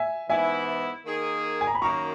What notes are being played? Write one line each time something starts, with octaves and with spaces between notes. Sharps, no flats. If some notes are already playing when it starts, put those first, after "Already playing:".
Already playing: E5 G#5
G#2 E3 B3 E4 E5 G#5
D#3 A#3 D#4 G#4
G#5
A#5
B5
F#2 D#3 A#3 A#5 C#6